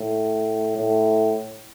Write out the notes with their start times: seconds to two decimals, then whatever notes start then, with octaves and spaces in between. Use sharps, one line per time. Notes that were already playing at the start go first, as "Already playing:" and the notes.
Already playing: A2
0.77 A2